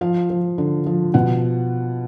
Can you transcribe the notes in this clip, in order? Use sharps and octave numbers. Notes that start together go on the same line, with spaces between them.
F3 F5
F3
D3
F3
B2 F#5